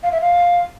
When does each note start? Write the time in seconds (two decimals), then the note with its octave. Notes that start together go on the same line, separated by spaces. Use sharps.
0.03 F5
0.12 E5
0.21 F5